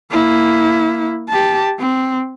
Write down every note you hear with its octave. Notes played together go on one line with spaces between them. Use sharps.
A#3 E4
G4 A5
C4